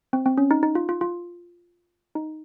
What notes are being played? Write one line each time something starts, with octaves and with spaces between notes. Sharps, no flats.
C4
C4
C#4
D#4
D#4
F4
F4
F4
D#4